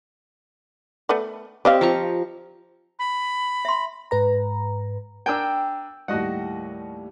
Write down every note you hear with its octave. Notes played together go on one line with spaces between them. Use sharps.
A3 B3 D5
C4 G4 D5 D#5 F5
F3 A#5 C#6
B5
E5 C6
G#2 B4 A#5
D4 A#4 G5 G#5 E6
D#2 A2 G3 F#4 D#5 F#5